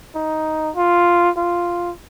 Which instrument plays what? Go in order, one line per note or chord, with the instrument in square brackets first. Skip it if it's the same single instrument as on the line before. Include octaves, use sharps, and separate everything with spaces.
[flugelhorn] D#4
F4
F4